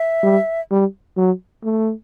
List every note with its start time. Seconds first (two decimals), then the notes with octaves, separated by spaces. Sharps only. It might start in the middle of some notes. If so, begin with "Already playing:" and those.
Already playing: E5
0.23 G3
0.71 G3
1.17 F#3
1.64 A3